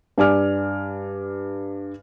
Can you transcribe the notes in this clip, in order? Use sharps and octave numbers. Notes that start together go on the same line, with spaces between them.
G2 D5 G#5 D6 F6